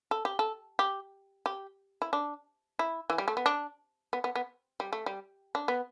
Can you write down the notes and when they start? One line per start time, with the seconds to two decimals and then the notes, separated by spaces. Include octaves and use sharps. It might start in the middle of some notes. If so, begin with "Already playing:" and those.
0.11 A4
0.25 G4
0.39 A4
0.79 G4
1.46 G4
2.02 E4
2.13 D4
2.79 E4
3.10 E3
3.18 G3
3.28 A3
3.37 B3
3.46 D4
4.13 B3
4.24 B3
4.35 B3
4.80 G3
4.93 A3
5.06 G3
5.55 D4
5.68 B3